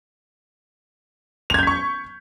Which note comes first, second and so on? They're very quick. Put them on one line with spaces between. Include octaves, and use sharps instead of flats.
F7 G#6 G6 B6 C#6